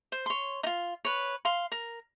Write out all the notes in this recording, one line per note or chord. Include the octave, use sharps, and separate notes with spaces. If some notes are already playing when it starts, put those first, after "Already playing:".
C5
C#5 C6
D#4 F4
B4 C#5
F5 C6
A#4